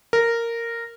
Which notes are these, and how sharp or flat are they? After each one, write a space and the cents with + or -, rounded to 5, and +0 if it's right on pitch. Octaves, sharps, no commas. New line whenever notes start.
A#4 -10